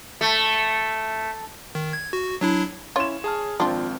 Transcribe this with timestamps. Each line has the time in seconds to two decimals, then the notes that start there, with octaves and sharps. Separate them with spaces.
0.21 A3
1.75 D#3
1.93 G#6
2.13 F#4
2.41 F#3 D4 E4
2.96 C#4 E4 F4 C#5 E7
3.24 G#4 A5 F6
3.60 G#1 F3 C4 D4 F4 G5